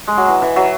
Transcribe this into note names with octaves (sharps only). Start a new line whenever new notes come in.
G#3
F#3
E3
E3
F#3